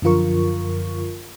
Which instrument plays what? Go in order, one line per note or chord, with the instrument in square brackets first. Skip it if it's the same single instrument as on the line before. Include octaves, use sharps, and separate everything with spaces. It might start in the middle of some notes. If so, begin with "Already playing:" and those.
[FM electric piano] F#2 D3 F3 F4 A#4 C#6